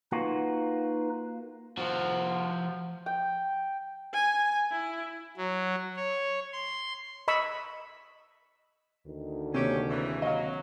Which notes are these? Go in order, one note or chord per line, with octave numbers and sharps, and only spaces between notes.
A#3 D#4 F4 F#4 B4
F3 F#4
G5
G#5
E4
F#3
C#5
C6
D#5 B5 C#6 E6
D2 D#3
D#2 C3 C#4 G4
G#2 C#3 E3
F#3 D#5 F5